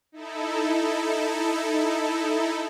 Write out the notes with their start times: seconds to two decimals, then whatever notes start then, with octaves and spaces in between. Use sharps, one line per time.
0.12 D#4 E4 A4